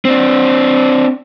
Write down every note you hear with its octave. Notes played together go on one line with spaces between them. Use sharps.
C4 D4